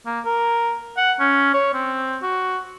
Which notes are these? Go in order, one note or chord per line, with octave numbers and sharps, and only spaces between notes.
A#3
A#4
F#5
C#4
C#5
C4
F#4